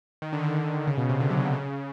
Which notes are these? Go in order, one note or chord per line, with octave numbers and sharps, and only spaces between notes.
D#3
D3
D#3
D3
C#3
B2
C3
D3
F#3
C3
C#3